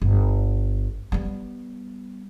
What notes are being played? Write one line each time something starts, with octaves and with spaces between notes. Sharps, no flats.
G1
G3 B3